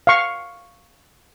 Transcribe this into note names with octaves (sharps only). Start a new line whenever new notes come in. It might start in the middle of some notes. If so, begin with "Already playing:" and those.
F5 C#6